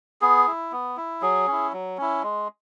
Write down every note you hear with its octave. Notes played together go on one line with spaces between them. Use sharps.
B3 G#4
E4
B3
E4
F#3 G#4
C#4 E4
F#3
C#4 E4
G#3